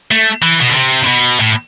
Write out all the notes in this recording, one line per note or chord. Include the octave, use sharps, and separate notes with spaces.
A3
E3
B2
D3
C3
C3
B2
A2